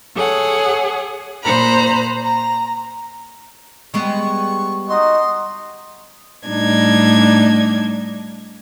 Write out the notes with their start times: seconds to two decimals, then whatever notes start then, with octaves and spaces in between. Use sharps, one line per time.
0.15 G#4 A4 C#5 F#5
1.43 A#2 C5 A#5 B5 F#6
2.23 A#5
3.94 G3 G#3 B3 C#6
4.89 D#4 F#4 D#5 C6
6.46 A2 G3 D4 D#4 G#6